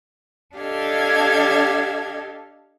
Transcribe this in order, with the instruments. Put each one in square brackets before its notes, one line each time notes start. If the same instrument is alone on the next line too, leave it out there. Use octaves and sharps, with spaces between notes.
[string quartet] D4 G4 A4 D#5 F5 G#6